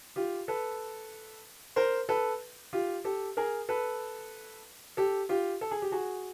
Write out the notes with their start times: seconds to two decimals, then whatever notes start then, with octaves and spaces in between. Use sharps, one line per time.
0.16 F4 G4
0.48 A4 B4
1.76 A#4 C5
2.09 A4 B4
2.73 F4 G4
3.04 G4 A4
3.37 G#4 A#4
3.69 A4 B4
4.97 G4 A4
5.29 F4 G4
5.61 A4
5.71 G#4
5.82 G4
5.92 F#4 G#4